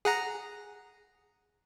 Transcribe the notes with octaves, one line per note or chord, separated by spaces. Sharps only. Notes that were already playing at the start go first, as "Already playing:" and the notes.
G#4 F#5 A#5